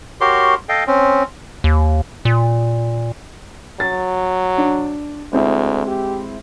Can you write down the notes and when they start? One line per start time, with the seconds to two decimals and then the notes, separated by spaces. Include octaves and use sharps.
0.21 F#4 G4 A#4 C#5 C6
0.69 A4 D#5 F5 G5
0.87 C4 C#4
1.64 D#2
2.25 A#2
3.80 F#3 A6
4.58 D4
5.33 D2 G#3 C4 E4
5.87 G4